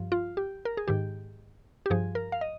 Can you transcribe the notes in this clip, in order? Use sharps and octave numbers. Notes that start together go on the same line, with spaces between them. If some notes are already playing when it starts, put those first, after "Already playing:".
Already playing: G2 F3
F4
G4
A#4
G#4
G#2 D#3 G4
G4
G2 F3 G#4
A#4
F5
D#5